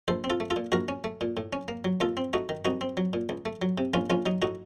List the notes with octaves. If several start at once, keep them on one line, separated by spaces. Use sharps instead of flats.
A#1 A4 C5
C4
F4 A4
A3
F4 A4
A#2
A#1 F#4 A#4
C#4
A3
A#2
A2
C#4
A#3
F#3
D#2 F4 A4
C4
A3 D#4 F#4
D#3
C2 D#4 F#4
C4
F#3
A#2
C#2
A3
F#3
C3
A#1 C#4 F4
A#1 C#4 F4
F#3 D#4
A2 D#4 F#4